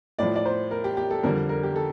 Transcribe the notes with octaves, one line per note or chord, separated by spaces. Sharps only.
A2 F3 D5
D5
C5
A#4
G4
G4
A4
F2 D3 G3 A#4
A#4
G4
A4